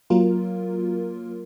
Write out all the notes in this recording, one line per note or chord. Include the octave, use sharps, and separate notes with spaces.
F#3 A#3 F4 A#4